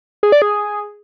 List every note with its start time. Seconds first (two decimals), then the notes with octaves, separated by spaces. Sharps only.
0.23 G#4
0.32 D5
0.42 G#4